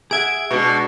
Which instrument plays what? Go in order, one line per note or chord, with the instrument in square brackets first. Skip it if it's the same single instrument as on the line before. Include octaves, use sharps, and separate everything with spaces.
[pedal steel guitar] G#4 E5 F#5 [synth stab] G#6 D7
[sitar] B2 [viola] G#3 D4 [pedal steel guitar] C#6